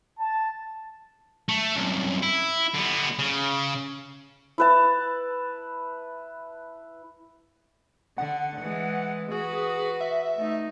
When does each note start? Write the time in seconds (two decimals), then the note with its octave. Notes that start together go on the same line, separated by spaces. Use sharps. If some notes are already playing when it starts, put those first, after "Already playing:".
0.18 A5
1.49 A3
1.76 C2 F#2
2.22 E4
2.74 D3 B3
3.19 C#3
4.58 E4 B4 A5
8.18 D3 F#5
8.60 E3 G#3
9.31 F#4 G#4 B4
10.01 E5
10.35 A3 D#4